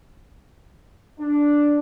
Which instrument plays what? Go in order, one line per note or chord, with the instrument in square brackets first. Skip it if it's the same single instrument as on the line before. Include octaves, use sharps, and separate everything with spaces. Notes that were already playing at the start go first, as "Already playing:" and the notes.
[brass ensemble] D4